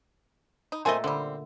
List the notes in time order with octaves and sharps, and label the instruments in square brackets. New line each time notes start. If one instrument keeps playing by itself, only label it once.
[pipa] D#4
[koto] A#2 A3 D#5 [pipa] C4 C5 G#5
[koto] D3 [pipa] G3 C4